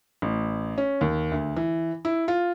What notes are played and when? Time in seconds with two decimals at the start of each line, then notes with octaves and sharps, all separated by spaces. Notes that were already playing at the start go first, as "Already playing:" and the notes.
0.22 A1
0.78 C#4
1.01 D#2
1.32 D2
1.56 E3
2.05 E4
2.28 F4